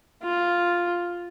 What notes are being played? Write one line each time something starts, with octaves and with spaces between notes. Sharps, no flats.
F4